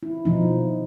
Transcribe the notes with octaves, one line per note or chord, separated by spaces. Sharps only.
E4
B2 F3 D#4